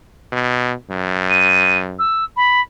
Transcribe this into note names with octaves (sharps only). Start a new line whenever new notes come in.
B2
F#2
D#7
E6
B5